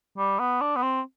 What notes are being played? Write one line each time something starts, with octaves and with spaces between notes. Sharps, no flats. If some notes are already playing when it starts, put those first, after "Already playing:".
G3
B3
D4
B3
C4